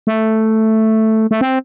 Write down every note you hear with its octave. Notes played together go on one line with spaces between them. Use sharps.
A3
A3
C4